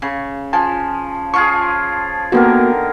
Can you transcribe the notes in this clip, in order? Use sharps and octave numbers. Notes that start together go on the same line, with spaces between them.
C#3
F3 G#5 A5
F3 F4 G#4 C#6
D3 D#3 A#3 B3 F#4 A#4